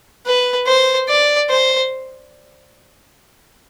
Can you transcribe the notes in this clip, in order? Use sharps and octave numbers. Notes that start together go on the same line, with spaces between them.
B4
C5
D5
C5